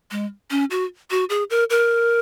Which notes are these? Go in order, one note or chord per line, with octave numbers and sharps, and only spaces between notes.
G#3
C#4
F#4
F#4
G#4
A#4
A#4